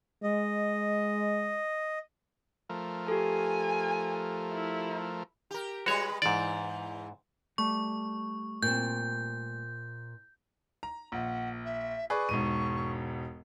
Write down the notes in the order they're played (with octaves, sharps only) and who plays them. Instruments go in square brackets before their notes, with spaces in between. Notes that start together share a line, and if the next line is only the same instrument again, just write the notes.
[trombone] G#3 [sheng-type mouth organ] D#5
[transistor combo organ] F3 A3 A#4
[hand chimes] G4 A4 [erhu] G#5
[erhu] E4
[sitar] G4 A#4
[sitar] G3 G#3 B4 [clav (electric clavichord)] F#4 C#5
[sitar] E2 E3 [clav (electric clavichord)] G#2 D5
[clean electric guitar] G3 A3 [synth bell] C#6
[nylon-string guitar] A#2 C4 [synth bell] G6
[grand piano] A#5
[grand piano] A#1 [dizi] F#5
[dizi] E5
[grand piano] G#4 B4 D5 [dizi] C#6
[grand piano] E1 G#2 D#7